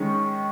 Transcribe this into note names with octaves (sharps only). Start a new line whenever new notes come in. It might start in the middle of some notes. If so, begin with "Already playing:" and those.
Already playing: D#3 G#3 C#4 C#6